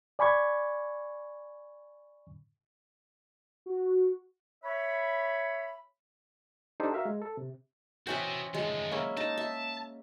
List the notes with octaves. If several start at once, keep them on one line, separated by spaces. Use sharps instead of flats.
D5 G#5 B5 C#6 G#6
F#4
C#5 E5 B5
D4 D#4 G4 A4 C5
F#4 A#4 E5 F5
G#3
A4
C3
E3 C#4 F#4 C5 D#5 E5 G5 D6
D#3 F3 G#3
A#3 C#4 E4
D#4 A5
E5